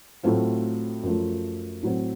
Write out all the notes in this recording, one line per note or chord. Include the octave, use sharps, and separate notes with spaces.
A2 F#3 A3 C4 F4
F#2 F3 A3
A2 F#3 C4